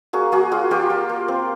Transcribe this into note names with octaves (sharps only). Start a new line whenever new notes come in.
A#3 F#4 G#4
A#3 F#4 G#4
F4 F#4 G#4
A#3 F4 G4
A#3
A#3
C4